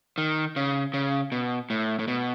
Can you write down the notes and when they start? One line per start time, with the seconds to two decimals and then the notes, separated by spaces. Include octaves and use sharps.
0.18 D#3
0.56 C#3
0.94 C#3
1.32 B2
1.70 A2
1.99 A2
2.08 B2